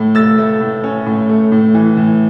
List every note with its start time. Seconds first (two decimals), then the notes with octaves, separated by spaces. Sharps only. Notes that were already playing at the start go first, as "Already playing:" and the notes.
Already playing: A2 A3
0.15 A3 E6 A6
0.38 A3
0.61 A2
0.84 C#4
1.06 A2
1.29 A3
1.52 A2
1.74 E3
1.97 A2